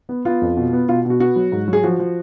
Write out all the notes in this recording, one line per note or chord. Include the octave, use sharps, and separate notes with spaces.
B3
B3 F4
F2
B2
B3
B2 F4
B2
F#4
B3 F#4
F#3
G#2
F#3
G#4
F3 F#4
F3